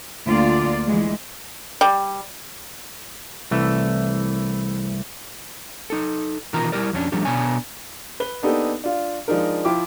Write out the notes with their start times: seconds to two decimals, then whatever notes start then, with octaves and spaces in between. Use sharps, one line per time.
0.25 D2 A#3 F4 D5
0.86 E3 G#3
1.81 G3
3.51 C2 E3 A3
5.90 D#4 A4
6.53 B2 D#3 E3 F4 A#4 A#5
6.72 G3 E4 G4 A#4 D5
6.93 F2 C#4 D4
7.12 F3 G3 A3 D4 G4
7.25 B2 B3 D4 C#5 G#5
8.20 B4 G7
8.43 A#3 B3 D4 D#4 G4 A4
8.84 D4 F4
9.28 F3 G#3 D4 D#4 A#4
9.65 F3 E4 F4 G5 D6